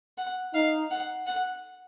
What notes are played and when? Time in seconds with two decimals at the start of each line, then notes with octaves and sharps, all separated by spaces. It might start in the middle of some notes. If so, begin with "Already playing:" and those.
0.18 F#5
0.54 D#4 F5
0.91 F#5
1.27 F#5